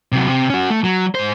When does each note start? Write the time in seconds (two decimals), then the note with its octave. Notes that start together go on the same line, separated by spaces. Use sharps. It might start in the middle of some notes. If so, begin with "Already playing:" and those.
0.12 C3 F#3
0.28 C3
0.50 C#4 F#4
0.70 A3
0.84 F#3
1.15 G#2 C5